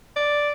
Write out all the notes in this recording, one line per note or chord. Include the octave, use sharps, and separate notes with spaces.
D5